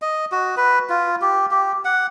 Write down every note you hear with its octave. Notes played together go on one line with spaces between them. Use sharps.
D#5
F#4
B4
F4
G4
G4
F#5